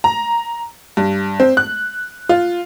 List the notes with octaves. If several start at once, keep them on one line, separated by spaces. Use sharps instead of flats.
A#5
G2
C4
F#6
F4